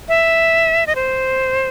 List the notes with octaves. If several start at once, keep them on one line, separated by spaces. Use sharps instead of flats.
E5
D#5
C5